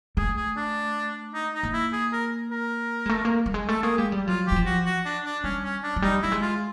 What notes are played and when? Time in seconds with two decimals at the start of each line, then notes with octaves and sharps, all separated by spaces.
0.17 A3 G#4
0.37 G#4
0.57 D4
1.34 D#4
1.54 D#4
1.63 A#3
1.73 E4
1.93 G#4
2.13 A#4
2.51 A#4
3.06 G#3
3.09 A3
3.25 A#3
3.46 G3
3.54 G#3
3.68 A3 A4
3.83 A#3 G#4
3.98 G#3 G4
4.12 G3
4.27 F#3 F4
4.47 G4
4.52 F#3
4.56 F3
4.66 F#4
4.85 F#4
5.05 D4
5.25 D4
5.44 G3 C#4
5.63 C#4
5.83 D4
5.96 F#3
6.02 G3 D#4
6.22 G3 E4
6.32 G#3
6.42 F4